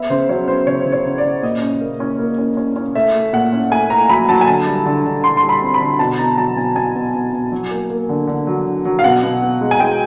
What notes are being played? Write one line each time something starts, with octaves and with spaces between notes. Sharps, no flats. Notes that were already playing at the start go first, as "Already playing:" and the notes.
Already playing: B3 E5
C#3 C5
F#3 C#5
B3 C5
C#3 C#5
C5
C#3
C#5
C#3
D5
C#3
A#2 D#5
C#4
A#3
C#4
A#3
C#4
C#4
C#4
A3 E5
A3
A#2 F#5
C#4
A3 G#5
A3 A#5
F#3 B5
F#3 A5
G#5
D3 A5
G3
D3
D3
D3 C6
C6
G3
B5
C4
B5
D3
B2 A5
B2 A#5
F#3 A5
B2 G#5
B2 G#5
B2
B2
B2
F#3
A#3
A#3
D3
D3
F#3
D3
F#3
F5
B2 F#5
B2
B2
G#3
G#5
G#3 G5